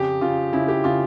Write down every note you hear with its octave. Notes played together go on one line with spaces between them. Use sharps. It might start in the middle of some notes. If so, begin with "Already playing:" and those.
Already playing: F2 C#3 G4
C#3 F4
C#3 E4
G4
C#3 F4